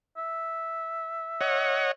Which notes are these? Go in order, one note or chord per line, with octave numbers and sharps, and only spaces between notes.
E5
C#5 D#5 F#5